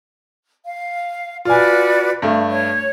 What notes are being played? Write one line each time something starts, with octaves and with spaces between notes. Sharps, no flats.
F5
F4 F#4 B4 D5 G#5
G2 A3
C#5